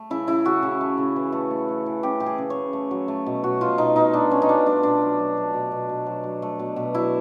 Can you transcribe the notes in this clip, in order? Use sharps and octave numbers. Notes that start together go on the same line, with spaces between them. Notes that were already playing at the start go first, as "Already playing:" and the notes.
Already playing: A3
C#3 E4
C#3 E4
C#3 F#4
C#3
A3
C#3
E3
A3
A3
A3
E3
C#3 G4
E3 G4
G#4
C#3
C#5
C#3
A3
F#3
A3
B2
B2 F#4
B2 F4
B2 D#4
B2 D#4
B2 D4
A3 C#4
D#4
B2 D4
A3 D4
B2 D4
F#3
F#3
A3
B2
B2
B2
F#3
F#3
A3
B2
B2
F#3 E4